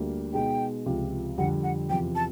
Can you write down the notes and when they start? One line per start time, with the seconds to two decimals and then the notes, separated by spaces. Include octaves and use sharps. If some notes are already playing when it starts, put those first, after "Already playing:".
Already playing: D2 D3 G3 A#3
0.33 B2 G#3 B3 D#4 G5
0.86 C#2 C3 F3
1.38 F2 D3 G3 F#5
1.63 F#5
1.90 E2 C3 F3 G5
2.15 A5